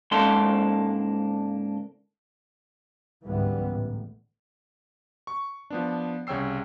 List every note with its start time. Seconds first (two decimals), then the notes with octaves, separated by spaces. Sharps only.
0.11 C#2 G#2 A#3 D4 A4 C6
3.25 C#2 G#2 D3 E3 G3 B3
3.71 A1 A2
5.27 C#6
5.70 F3 B3 D4
6.27 C2 C#3 C#5 G5 E6 C7